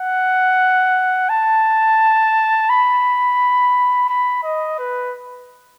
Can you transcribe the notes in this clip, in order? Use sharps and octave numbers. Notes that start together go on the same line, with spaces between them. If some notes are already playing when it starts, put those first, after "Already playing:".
Already playing: F#5
A5
B5
B5
D#5
B4